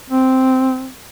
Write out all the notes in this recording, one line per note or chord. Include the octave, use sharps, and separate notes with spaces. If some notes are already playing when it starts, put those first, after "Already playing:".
C4